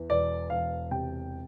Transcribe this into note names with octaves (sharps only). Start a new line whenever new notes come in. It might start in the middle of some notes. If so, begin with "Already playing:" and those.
Already playing: E2
E1 D5
E1 F5
C3 G5